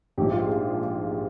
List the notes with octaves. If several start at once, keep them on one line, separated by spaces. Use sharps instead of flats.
A#1 G#2 F3 G4
F4
G#4